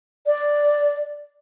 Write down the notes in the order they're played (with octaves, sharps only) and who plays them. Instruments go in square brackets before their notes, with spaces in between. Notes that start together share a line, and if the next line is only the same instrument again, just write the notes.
[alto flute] D5